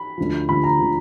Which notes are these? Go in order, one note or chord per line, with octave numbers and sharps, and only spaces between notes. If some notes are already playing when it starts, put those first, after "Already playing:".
Already playing: B5
D2 D3 F3
D2 D3 F3 B5
A#5
D3 F3